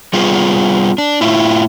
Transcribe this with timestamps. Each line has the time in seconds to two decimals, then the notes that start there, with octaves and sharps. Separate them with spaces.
0.13 G3 B3 F4 G#4
0.98 D4
1.21 A2 E4 F4